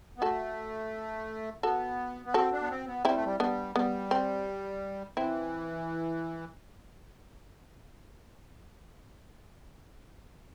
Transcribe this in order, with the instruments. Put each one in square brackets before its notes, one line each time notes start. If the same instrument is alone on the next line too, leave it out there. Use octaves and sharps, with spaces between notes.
[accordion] B3
[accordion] A3 [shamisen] F#4 A4
[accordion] B3 [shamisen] F#4 A4
[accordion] B3
[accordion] C4 [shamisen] F#4 A4
[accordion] D4
B3
C4
B3
[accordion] G3 [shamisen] C4 E4
[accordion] A3
G3
[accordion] G3 [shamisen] B3 D4
[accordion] G3 [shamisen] B3
[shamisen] C4
[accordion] E3 [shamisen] C4 E4